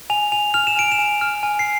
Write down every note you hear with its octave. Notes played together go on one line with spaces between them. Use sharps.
G#5 F7
G#5 F7
F6 F7
E7
G#5 D7
E7
G#5
F6
G#5
C7